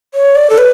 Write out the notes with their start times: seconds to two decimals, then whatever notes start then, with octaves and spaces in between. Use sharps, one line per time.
0.14 C#5
0.35 D5
0.50 A4
0.58 B4